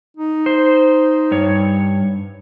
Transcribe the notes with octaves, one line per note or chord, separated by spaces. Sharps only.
D#4
C5
G2 C#5